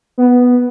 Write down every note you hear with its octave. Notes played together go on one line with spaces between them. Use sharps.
B3